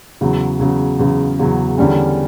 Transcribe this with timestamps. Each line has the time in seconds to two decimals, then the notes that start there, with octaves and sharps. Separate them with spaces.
0.21 E2 C#3 F#3
0.60 E2 C#3 F#3
0.99 E2 C#3 F#3
1.39 E2 C#3 F#3
1.78 E2 D3 G3 C#4